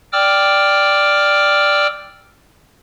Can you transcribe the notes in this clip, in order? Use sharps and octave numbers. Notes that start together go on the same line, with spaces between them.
D5 G5 D6 E6 F6